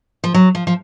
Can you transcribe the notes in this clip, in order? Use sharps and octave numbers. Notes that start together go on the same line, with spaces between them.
F3
F#3
F3
F3